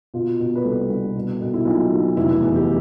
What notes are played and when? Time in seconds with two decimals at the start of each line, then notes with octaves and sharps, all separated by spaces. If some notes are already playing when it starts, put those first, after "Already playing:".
0.14 B2 F4
0.40 B2
0.55 B4
0.64 C2 A4
0.90 C2
1.15 B2
1.41 B2
1.54 E4
1.66 B1 F4
1.91 B1
2.16 F1 E4
2.41 E2
2.56 G4